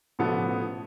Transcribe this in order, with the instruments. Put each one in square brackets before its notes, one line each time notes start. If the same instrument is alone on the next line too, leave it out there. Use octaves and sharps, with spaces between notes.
[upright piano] A1 B2 F3 B3 A4 D#6